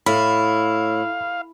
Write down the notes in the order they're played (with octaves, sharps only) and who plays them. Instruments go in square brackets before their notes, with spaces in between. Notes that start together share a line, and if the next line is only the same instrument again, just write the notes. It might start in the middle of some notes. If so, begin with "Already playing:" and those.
[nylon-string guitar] A2 [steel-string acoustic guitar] E4 [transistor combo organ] F5 [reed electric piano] B5